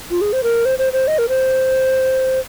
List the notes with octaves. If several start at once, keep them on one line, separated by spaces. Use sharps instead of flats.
F4
G#4
C5
A#4
C5
C5
C5
D#5
A#4
C5